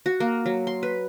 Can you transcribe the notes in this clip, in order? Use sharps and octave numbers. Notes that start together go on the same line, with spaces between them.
F#4
A#3
F#3
C6
B4